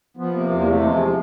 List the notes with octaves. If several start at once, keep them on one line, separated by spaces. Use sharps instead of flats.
F3 B3
C3 A#3
E2 A#3
C3 A3
F3 G#3